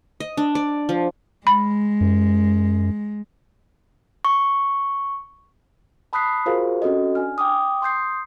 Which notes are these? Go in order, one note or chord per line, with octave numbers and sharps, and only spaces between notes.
D#5
D4
D5
F3
G#3 B5
F#2
C#6
A5 B5 D#6 F#6 B6 C7
F4 F#4 G#4 A#4 C5 F5
C4 C#4 F#4 A4 D#5
D4 G#5 F6
G5 D6 D#6
C6 D#6 G6 C7